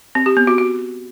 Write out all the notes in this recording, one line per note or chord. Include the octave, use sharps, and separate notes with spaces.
C4
G4
B3
F#4
F#4